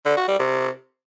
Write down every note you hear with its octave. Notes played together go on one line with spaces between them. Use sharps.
D3
F#4
G3
C3